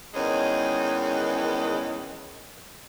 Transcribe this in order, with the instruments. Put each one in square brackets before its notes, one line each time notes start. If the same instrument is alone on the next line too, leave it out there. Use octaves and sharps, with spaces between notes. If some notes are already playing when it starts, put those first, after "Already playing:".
[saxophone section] E2 D#3 G#3 C#4